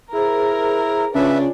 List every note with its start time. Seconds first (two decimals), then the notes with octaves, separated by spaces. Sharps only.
0.13 E4 G#4 A#4 C5
1.15 C#3 C#4 D4 F4 B4 E5